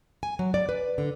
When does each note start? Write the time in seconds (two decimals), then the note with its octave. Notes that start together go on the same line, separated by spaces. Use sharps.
0.23 G#5
0.39 F#3
0.54 D5
0.69 B4
0.98 D3